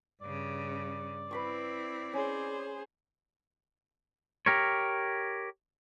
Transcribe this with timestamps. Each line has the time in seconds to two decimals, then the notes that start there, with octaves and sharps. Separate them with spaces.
0.22 G2 C#3 D5
1.31 C4 E4 B4 B5 C#6
2.13 C#4 G#4 C5
4.46 G4 A#4 C#5